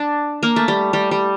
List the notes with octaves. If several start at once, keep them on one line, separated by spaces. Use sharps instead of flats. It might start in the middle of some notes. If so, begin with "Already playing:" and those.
Already playing: D4
A#3
A3
G3
G3
G3